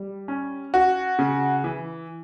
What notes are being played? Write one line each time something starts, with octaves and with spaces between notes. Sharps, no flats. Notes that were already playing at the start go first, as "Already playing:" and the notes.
Already playing: G3
C#4
F#4
C#3
E3